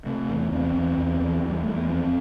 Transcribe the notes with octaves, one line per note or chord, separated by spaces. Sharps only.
C3 A3
E2
E2 C4
E2
E2
E2
E2
G3
E2 A3
B3
F2 C4